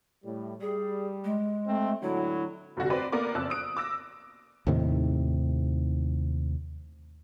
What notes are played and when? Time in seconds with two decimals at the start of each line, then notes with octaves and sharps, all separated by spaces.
0.24 A2 G3
0.61 G3 G#4
1.24 G#3
1.67 A3 C4
2.02 A2 D3 F#3 E4
2.77 F1 G2 D3 F#4 A#6
2.90 C4 B4 C5 D5
3.12 A#3 B3 A#4 D5 D6
3.34 F#1 F2 D5 A5 E6 F#6
3.50 D#6 D7
3.77 D6 E6 A#6
4.67 D#2 A2 C3 D#3